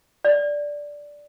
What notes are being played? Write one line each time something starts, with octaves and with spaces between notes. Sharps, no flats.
D5